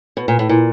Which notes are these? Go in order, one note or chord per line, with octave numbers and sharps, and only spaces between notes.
B2
A#2
A2
A#2